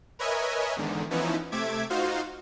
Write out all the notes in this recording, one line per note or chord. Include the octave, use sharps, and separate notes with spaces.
A#4 B4 C#5 D#5 E5 G#5
E2 G#2 D3 D#3
E3 F3 B3 C#4 D#4 E4
C3 A3 E5 D6 G#6
D#4 F4 F#4 C5 F5